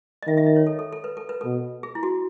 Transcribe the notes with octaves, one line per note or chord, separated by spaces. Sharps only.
D#5
D#3 E5
E5
D#5
C#5
A4
A4
A4
B4
A4
B4
B2 A4
G#4
E4
F#4